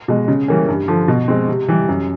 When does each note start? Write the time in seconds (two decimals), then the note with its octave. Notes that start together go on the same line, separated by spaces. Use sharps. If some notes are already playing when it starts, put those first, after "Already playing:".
0.08 B2 G#3
0.28 C#3
0.48 E3 G3 A#3 C#4
0.69 G2
0.88 D3 F3
1.08 B2
1.28 G#3 C4
1.48 C3
1.68 E3 G3
1.89 F#2